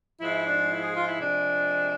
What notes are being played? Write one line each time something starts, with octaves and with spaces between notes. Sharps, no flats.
G#2 F3 G#3 E4
D4
E4
G#4
F4
E4
C3 F3 G#3 D4